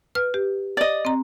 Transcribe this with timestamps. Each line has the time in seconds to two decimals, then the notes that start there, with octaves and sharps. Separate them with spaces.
0.15 B4 F6
0.34 G4
0.77 D5 D#5
1.05 C4 A#5